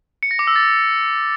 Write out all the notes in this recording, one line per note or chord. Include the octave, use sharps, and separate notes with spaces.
C#7
A#6
D6
E6
A6